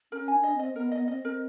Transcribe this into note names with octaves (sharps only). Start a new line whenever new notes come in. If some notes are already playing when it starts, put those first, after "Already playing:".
C#4 A#4
D4 G#5
D#5
C4 D#5
B3 A#4
B3 D#5
C4 D#5
C4 A#4